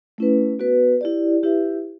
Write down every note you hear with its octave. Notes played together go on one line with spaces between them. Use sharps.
A3 C#4 E4 B4
B3 F#4 B4
E4 G4 D5
E4 G4 B4 E5